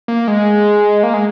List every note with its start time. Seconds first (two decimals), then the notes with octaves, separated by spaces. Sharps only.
0.08 A#3
0.28 G#3
1.03 A#3
1.14 G#3